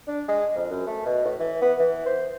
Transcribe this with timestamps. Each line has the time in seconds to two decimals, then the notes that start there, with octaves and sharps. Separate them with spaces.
0.08 D4
0.28 G#3
0.55 F2
0.70 F#2
0.87 A3
1.06 B2
1.25 A2
1.40 E3
1.62 B3
1.80 E3
2.06 C5